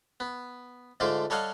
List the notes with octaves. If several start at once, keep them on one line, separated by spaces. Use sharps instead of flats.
B3
G#2 D3 A3 F4 D6
G3 A4 C#5 D#5 F5 F#5